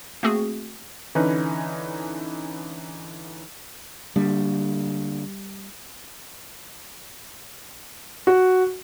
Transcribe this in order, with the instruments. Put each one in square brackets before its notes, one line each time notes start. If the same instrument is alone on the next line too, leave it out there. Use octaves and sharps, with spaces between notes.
[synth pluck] A3 A#3 C4 F#4 G#4
[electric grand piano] D3 E3 C#4 D#4 B4
[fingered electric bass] D3 A#3 D4 [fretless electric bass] G3
[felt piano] F#4